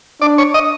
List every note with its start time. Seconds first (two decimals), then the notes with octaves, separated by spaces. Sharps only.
0.21 D4 D5
0.38 C#5
0.54 D#5